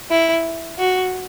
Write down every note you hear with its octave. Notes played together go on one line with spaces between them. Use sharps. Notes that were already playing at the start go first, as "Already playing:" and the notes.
E4
F#4